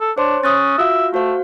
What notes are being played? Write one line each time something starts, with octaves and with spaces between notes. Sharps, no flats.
A4
D4 C5 C#5 C6
C#4 D#6 F#6 A6
F4 F#4 E5 F5
A3 F#4 C5 F5